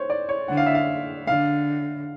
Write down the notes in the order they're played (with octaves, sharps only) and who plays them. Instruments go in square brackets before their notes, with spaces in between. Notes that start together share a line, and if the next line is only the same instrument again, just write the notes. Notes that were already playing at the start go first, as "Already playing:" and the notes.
Already playing: [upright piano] C5 C#5
D5
C#5
[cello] D3 [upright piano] F#5
[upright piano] F5
E5
F5
[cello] D3 [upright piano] F5